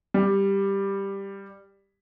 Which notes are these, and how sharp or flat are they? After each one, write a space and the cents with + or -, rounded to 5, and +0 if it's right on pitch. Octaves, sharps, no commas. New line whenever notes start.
G3 +5